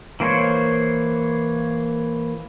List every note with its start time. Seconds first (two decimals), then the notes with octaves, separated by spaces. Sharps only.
0.20 E3 A#3 C5 C#5